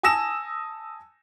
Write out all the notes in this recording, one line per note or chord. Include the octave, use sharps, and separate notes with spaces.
G#5 A5 D#6 E6 A#6 E7